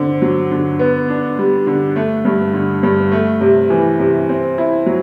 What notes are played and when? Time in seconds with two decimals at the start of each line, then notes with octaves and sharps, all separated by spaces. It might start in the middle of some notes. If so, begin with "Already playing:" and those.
Already playing: D3 C4
0.22 F#3
0.51 D3
0.79 B3
1.08 D4
1.39 G3
1.67 D3
1.96 A3
2.25 G2
2.54 D3
2.83 G2
3.12 A3
3.41 C3
3.70 E3
3.99 C3
4.29 C4
4.58 E4
4.86 F#3